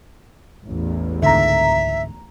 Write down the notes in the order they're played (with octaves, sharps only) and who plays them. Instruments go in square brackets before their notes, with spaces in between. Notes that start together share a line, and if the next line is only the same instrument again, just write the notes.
[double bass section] A1 E2
[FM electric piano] C#2 A#5 [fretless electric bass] G#2 D3 [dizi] E5